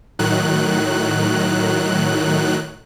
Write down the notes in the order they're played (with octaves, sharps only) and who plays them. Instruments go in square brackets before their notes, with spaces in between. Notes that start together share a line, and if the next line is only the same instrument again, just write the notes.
[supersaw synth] A2 D#3 F#3 F#6